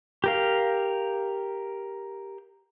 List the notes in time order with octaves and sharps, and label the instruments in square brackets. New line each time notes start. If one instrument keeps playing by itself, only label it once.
[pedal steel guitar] G4 A#4 F5